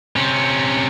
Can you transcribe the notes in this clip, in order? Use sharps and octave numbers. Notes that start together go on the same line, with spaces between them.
C3 C#4